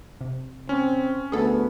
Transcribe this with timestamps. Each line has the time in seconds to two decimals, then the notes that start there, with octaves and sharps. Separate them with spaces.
0.21 C3
0.69 C4 C#4
1.32 D2 B3 G#4 A4